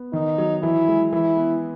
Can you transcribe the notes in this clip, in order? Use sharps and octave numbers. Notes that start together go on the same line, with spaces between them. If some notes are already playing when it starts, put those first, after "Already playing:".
Already playing: B3
D#3 D#4
F#3
E3 E4
G#3
E3 E4
B3